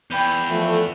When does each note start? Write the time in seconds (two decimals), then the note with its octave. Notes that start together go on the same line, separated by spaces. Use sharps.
0.11 E2 G5 B5 G6
0.50 F3 A3